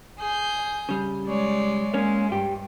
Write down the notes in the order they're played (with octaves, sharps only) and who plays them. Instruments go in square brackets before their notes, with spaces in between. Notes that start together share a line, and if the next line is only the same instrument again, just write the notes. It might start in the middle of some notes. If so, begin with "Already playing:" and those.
[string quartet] G#4 G6
[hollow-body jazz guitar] C#3 G3
[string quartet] G#3 C#5 D5
[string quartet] G#3 [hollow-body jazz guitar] A#3 C#4
[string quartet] G2 [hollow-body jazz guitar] G4